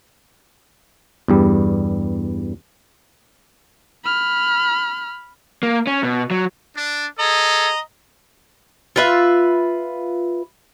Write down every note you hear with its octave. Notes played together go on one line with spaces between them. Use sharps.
E2 G2 G3
B5 F6
A#3
C#4
B2
F#3
D4
G#4 A4 D#5 A#5
F4 B4 E5